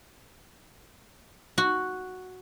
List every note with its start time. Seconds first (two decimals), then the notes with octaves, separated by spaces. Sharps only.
1.58 F#4